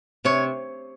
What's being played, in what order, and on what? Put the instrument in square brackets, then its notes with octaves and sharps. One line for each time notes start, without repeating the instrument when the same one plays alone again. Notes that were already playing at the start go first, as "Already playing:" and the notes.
[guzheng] C3 C#5